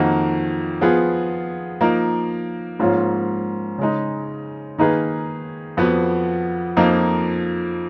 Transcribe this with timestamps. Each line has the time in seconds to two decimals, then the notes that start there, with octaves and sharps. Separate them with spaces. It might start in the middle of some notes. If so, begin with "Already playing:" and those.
Already playing: F2 D#3 A#3 D#4 F#4
0.81 F3 B3 F4 G#4 B4
1.81 F3 A#3 D#4 A#4
2.79 G#2 F3 A#3 C#4 F4
3.78 C#3 G#3 D#4
4.78 D#3 A#3 D#4 G#4 B4
5.77 F2 F3 B3 F#4 B4
6.76 F2 F3 A#3 D#4